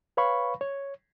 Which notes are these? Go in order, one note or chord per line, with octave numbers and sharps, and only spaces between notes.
B4 C#5 F5 B5 C#6
C#5